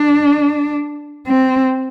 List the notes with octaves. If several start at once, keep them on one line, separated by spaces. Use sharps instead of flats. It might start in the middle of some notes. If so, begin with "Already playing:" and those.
Already playing: D4
C4